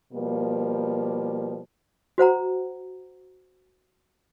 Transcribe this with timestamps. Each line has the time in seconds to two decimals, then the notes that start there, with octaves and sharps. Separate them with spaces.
0.13 B2 F3 G3 A#3
2.18 F#4 C5 F#5 A#5